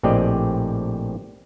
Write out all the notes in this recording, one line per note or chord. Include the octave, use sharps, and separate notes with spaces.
A#1 A2 C4 G4 D5 D#5